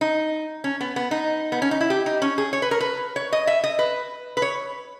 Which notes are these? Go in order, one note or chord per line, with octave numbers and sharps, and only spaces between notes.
D#4
C#4
B3
B3
D#4
B3
C#4
D#4
E4
G4
D#4
C#4
G#4
C#5
B4
A#4
B4
C#5
D#5
E5
D#5
B4
B4
C#5